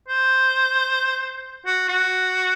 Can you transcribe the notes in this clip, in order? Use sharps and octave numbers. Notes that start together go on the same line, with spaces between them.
C5
F#4
F#4